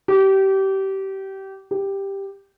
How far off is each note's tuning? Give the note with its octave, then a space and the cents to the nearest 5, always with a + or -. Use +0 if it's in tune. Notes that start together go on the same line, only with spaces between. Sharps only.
G4 -25
G4 +5